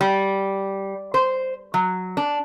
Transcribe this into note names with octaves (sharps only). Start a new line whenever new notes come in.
G3
C5
F#3
D4